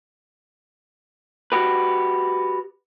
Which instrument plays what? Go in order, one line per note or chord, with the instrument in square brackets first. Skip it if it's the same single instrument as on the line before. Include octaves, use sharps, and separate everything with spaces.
[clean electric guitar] F#4 G4 B4